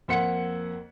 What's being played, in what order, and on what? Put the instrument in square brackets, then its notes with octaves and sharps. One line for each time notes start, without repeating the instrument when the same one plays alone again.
[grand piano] F2 A#3 C5 F#5 B6 C#7